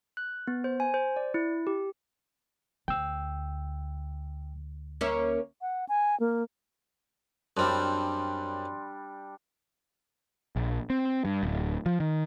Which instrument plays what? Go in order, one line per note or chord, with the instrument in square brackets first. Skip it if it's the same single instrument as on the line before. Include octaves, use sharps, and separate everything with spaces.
[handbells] F#6
B3
C5
G#5
C5
D5
E4
G4
[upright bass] D2 [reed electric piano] G5 E6
[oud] A#3 C#4 E5
[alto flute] F#5
G#5
A#3
[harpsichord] F#2 C4 [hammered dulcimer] G3 D4 [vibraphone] C6
[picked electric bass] A#1
C4
G2
D1
F3
D#3